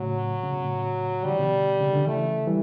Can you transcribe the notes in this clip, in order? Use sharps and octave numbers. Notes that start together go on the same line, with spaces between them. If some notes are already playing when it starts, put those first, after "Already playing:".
Already playing: A2 C#3 F#3
C#3
B2
A2 C#3
D3 G3
E3
B2 D3
C#3
D3
C#3 E3 A3
E3 G3